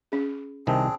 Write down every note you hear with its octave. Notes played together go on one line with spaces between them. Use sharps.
C#4 G#4
C2 C3 D#3 C4 D4 G#4